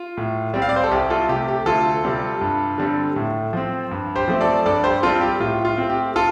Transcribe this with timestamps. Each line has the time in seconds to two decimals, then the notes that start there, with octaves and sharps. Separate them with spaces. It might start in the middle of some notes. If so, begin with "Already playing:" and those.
Already playing: F4
0.17 A2
0.54 G3 C4
0.62 F5
0.69 D5
0.76 C5
0.84 A4
0.91 C2 G4
1.10 F4 A4
1.29 C3 A3 G4
1.48 G4
1.66 D2 F4 A4
2.04 C3 G3 C4
2.41 G2
2.78 D3 G3 C4
3.16 A2
3.53 F3 C4
3.91 G2
4.16 G4 C5
4.28 F3 A3 C4
4.41 A4 D5
4.66 G2 A4 D5
4.84 G4 C5
5.03 G3 C4 F4 A4
5.21 G4
5.40 A2 F4
5.65 F4
5.77 A3 C4
5.90 G4
6.16 F4 A4